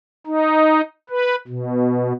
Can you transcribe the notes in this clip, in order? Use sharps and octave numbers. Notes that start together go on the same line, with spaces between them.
D#4
B4
B2